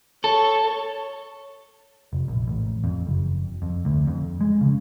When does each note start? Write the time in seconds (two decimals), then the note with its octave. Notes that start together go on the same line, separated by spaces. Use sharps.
0.24 A4 C#5
2.13 F1
2.28 A#1
2.48 A1
2.84 F2
3.07 F#1
3.62 F2
3.85 D2
4.07 F2
4.41 G#3
4.61 C#3